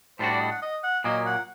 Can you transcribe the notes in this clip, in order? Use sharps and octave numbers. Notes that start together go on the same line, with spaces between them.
A2 G3 D4 F#4 C5
D5
D#5
F#5
D#5
F#5
A#2 F#3 A#3 D#5
F#5